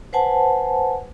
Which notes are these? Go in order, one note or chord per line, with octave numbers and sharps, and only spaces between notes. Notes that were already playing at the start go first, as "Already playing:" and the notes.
B4 C5 F#5 G#5 A5